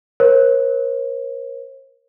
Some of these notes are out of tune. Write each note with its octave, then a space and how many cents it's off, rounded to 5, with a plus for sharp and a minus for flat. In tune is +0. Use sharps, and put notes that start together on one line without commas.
A#4 +35 C#5 -45